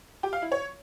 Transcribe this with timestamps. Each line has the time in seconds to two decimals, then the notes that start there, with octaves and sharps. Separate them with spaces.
0.23 G4
0.33 F5
0.42 E4
0.52 C#5